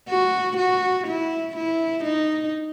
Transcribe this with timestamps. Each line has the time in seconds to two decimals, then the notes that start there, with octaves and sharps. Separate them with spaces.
0.09 F#4
0.57 F#4
1.07 E4
1.56 E4
2.05 D#4